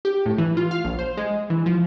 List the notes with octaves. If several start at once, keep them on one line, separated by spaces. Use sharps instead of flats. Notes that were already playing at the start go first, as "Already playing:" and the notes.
G4
A2
E3
F4
F5
A#1
C5
G#3
E3
F3